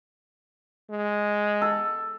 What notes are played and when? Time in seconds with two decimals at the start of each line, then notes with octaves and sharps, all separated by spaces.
0.90 G#3
1.62 A4